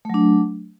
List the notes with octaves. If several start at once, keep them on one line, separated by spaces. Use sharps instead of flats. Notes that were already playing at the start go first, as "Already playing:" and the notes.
F#3 A3 D4